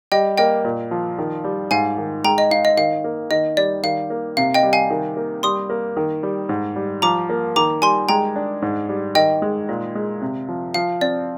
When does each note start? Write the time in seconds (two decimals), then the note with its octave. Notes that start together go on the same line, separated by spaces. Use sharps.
0.12 G3 D#5 G5
0.38 A#3 D#5 G5
0.65 A#2
0.91 F3
1.18 D#3
1.44 G3
1.71 G#2 F5 G#5
1.98 D#3
2.24 G#3 G5 A#5
2.38 D#5
2.51 D#4 F5
2.65 D#5
2.77 D#3 F5
3.04 A#3
3.31 D#3 D#5
3.57 G3 D5
3.83 D#3 F5
4.10 A#3
4.37 C3 F5
4.54 D#5 G5
4.63 G3
4.73 F5 G#5
4.90 D#3
5.17 A#3
5.43 G3 C6 D#6
5.70 A#3
5.97 D#3
6.23 G3
6.49 G#2
6.76 G3
7.02 F3 A#5 D6
7.29 A#3
7.56 D#3 A#5 D6
7.82 G3 G#5 C6
8.09 G#3 G5 A#5
8.36 D4
8.62 G#2
8.89 G3
9.15 D#3 D#5 G5
9.42 G#3
9.69 A#2
9.95 G#3
10.21 C3
10.49 F3
10.74 F3 F5
11.01 C4 D5